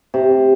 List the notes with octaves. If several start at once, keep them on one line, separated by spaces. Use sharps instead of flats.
C3